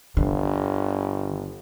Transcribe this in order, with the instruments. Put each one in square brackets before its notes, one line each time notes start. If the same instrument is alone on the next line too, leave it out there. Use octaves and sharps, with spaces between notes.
[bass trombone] G1 [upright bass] D3